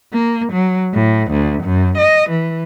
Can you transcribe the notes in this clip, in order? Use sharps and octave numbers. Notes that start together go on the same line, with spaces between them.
A#3
F#3
A2
D2
F#2
D#5
E3